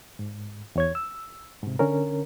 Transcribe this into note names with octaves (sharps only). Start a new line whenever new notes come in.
G#2
E2 C#5 G#6
E6
G#2 C3
D3 C#4 A#4